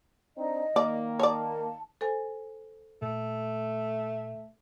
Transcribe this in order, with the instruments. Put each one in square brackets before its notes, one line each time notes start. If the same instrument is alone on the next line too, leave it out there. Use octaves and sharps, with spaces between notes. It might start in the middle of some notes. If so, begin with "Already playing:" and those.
[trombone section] C4 D4 D#4 [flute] D#5
[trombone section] D#3 [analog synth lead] A#3 [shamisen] D5
[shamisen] C#5 D5 [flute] A5
[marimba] A4 C5 G#5
[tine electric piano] A#2 [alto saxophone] A3